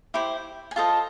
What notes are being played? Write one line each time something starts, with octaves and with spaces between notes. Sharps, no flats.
E4 G4 C5
G#5
F4 A4 C5 D#5 A5